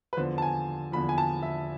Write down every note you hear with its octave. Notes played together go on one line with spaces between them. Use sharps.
B4
E2 D3 F3 C5
A5
G#5
E2 D3 F3 B5
G#5
A5
E5